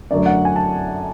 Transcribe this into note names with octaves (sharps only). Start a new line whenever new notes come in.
F#2 D3 F#3 A3 D5
F#5
G#5
A5